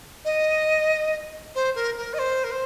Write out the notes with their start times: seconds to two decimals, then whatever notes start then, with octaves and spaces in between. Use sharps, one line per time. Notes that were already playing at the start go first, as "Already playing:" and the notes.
0.24 D#5
1.55 C5
1.75 A#4
1.97 A#4
2.13 D#5
2.18 C5
2.44 A#4
2.51 C5